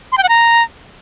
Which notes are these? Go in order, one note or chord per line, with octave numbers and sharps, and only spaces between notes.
C6
G5
F#5
A#5